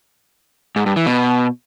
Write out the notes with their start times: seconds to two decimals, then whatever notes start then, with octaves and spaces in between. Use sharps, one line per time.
0.76 G#2
0.86 G2
0.96 E3
1.07 B2